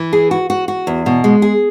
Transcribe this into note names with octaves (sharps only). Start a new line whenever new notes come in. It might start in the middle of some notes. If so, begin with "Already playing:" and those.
Already playing: E3
G#4
F#4
F#4
F#4
E2
B2
G#3
G#4